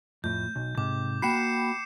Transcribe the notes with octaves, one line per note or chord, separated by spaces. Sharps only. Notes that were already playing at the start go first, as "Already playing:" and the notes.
F2 A2 G6
B1
G#2 C3 D6
A#3 F#4 G5 B5 C7 C#7 E7